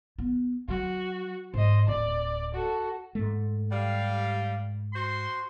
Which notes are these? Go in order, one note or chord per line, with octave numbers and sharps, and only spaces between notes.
B3
F#3 F#4
G#2 C5 D#5
D1 D5
F#4 A4
G#2 A3
G3 F5
F#4 C5 C6